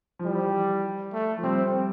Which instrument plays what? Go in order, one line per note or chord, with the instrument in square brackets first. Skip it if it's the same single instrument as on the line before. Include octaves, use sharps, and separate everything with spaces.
[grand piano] F3
[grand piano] E3 [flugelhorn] G3
[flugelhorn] A3
[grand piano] F3
[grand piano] G3 [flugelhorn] C4